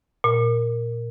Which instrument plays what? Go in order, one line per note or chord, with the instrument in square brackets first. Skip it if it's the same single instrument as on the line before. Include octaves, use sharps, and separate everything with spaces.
[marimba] A#2